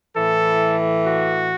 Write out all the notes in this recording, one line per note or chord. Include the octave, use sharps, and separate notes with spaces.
A2 E3 A4
F#4